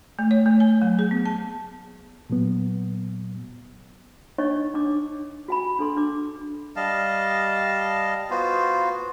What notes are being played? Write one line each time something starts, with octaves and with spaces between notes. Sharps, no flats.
A3
C#5
A3
G#5
F#3
G#4
B3
A5
A#2 F#3 B3
D4 D#4 C#5 D#5 C#6
D4 D6
F#4 G#5 B5
D4 A4 C6
D4 D6
G3 D#5 F5 A5
B3 F4 F#4 C5